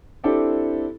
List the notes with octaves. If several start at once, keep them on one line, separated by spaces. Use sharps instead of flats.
C4 D4 E4 G4 A4